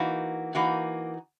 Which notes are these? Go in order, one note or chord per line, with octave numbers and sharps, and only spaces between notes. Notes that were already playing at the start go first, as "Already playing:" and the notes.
Already playing: E3 A#3 D#4 F#4
E3 A#3 D#4 F#4